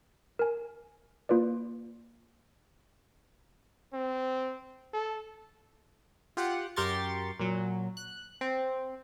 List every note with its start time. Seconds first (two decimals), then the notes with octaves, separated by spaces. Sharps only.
0.39 A#4 G#5
1.29 A#3 F4 B4 D5
3.93 C4
4.93 A4
6.37 F4 G4 F#5
6.76 F#2 G4 A#4 C6 C#6 A6
7.39 A#2 F#3
7.97 F#6
8.41 C4